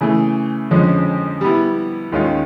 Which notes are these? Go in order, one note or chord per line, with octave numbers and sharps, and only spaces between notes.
C#3 E3 A3
F2 D3 F3 G#3 C#4
G3 B3 E4
D#2 D#3 G#3 C#4 F4